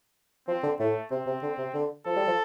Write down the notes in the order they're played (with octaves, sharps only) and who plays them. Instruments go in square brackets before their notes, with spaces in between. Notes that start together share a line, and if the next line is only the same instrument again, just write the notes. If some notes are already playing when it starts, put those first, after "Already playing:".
[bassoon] F3 [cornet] C4
[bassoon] D3
[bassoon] A2 [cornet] A3
[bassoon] C3 [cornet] C4
[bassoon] C3
D3
C3
D3
[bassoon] F3 [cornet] A4
[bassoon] G3
F3